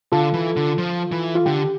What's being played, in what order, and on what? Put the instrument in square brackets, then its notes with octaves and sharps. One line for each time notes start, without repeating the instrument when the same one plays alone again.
[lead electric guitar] D3 [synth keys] F4 A4
[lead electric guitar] E3
D3
F3
E3
[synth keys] F4
[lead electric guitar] D3 [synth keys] G4